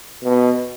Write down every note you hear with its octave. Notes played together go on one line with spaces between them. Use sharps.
B2